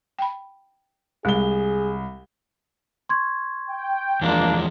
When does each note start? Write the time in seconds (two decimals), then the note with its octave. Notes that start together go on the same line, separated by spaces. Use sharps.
0.19 G5 B5
1.25 C2 G#3 G#4 G7
3.09 C6 C#6 G#6
3.69 G5
4.21 E2 F3 G#3 A#3 D4